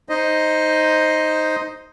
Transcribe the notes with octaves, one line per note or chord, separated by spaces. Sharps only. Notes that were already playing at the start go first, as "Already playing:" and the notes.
D#4 C5 D#5